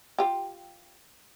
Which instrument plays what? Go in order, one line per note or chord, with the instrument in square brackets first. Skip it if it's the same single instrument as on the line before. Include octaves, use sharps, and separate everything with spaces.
[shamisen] F4 G4